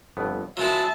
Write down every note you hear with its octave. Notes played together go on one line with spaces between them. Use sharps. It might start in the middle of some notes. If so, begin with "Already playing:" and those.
G1 F2 B3
F#3 G#3 E4 F4 A#4 C5 E5 A5